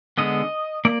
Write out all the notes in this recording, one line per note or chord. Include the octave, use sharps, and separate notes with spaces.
D3 G#3 B3 D#5
A#3 D5